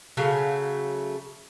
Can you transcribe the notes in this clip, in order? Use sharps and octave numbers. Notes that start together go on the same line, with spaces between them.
C#3 F#3 A3 F5